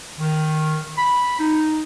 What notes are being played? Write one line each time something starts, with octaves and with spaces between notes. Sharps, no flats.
D#3
B5
D#4